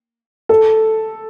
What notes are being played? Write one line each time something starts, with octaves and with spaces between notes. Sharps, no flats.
A4